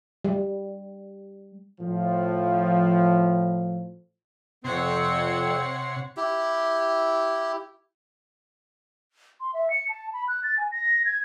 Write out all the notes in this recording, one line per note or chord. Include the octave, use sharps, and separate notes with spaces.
G3
A2 F3
F2 C3 C4 C#5 F#5 C6
E4 G4
C6
E5
C#7
A5
B5
F#6
A6
G#5
A#6
G#6